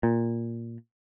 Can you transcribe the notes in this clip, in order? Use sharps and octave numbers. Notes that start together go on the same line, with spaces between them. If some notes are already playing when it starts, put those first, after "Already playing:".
A#2